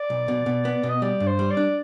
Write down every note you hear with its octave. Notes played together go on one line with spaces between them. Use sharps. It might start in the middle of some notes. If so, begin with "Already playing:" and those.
Already playing: D5
B1
B2
B2
B3
B2
D#5
G3 D5
G2
C5
G3
D5
D4